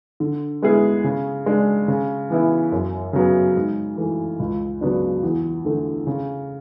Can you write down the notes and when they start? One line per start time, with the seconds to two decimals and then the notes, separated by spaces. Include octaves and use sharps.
0.20 D3
0.62 G#3 B3 E4 G#4
1.04 C#3
1.46 G#3 D4
1.88 C#3
2.30 E3 B3 E4
2.72 F#2
3.13 C#3 F#3 B3
3.56 G#2
3.97 E3 A3
4.40 C#2
4.81 C#3 F#3 B3 D4
5.23 E2
5.65 D3 A3
6.07 C#3